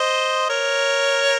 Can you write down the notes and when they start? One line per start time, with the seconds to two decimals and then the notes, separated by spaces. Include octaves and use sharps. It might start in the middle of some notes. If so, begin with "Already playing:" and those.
Already playing: C5 D#5
0.49 A#4 C#5